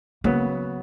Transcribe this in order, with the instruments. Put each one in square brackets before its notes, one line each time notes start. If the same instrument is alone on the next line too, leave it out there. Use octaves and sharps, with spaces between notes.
[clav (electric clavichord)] C#3 F#3 B3 [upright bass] A#3